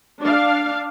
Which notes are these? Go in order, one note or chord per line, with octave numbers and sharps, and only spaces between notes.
D4 F5